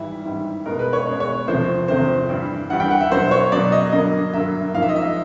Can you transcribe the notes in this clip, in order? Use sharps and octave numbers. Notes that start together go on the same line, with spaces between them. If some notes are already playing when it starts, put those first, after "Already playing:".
Already playing: G#2 E3 G3 E4
G#2 E3 G3
B2 G#3 B3 A#4
B4
C#5
B2 G#3 B3
C#5
E2 C3 F3 A3 C4 C5
E2 C3 F3 A3 C4 C5
G2 E3 G3
G2 E3 G3 F#5
G5
F#5
E5
B2 F#3 B3 C5
C#5
B2 F#3 B3 D5
D#5
G2 D3 F#3 A#3 D#5
G2 D3 F#3 A#3 E5
G#2 F3 A#3 F5
E5
D#5
E5